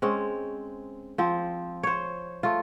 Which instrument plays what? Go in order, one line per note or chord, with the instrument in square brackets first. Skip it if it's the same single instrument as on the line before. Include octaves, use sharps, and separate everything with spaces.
[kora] G#3 C4 C#4
F3 C4
C5 C#5
A3 F4